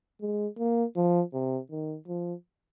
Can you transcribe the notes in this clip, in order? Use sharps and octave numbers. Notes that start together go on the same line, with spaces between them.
G#3
A#3
F3
C3
D#3
F3